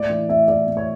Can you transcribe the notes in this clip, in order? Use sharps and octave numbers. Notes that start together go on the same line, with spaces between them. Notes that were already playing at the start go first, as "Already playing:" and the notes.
Already playing: A2 D5
E3
A2 E5
A2 D5
A2
C#5